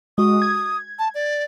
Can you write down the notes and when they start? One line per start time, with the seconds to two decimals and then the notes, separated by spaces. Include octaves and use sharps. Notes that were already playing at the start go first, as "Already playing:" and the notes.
0.18 G#3 F#4 D#6
0.42 G#6
0.99 A5
1.14 D5